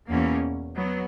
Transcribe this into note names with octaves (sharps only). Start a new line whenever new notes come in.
E2 B2 A#3 C#4
F#3 B3